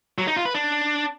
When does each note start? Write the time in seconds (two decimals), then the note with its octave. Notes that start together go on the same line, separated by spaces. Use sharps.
0.18 F#3
0.27 D#4
0.36 F4
0.46 B4
0.55 D4